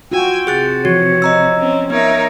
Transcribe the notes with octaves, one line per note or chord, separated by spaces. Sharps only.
F4 F#4 G5 G#5 E6
C3 G#4 F#6 A6
E3 F3 F#4 C#5
D#5 A#5 E6
C4 C#4
B3 D#4 A#4 C#5 E5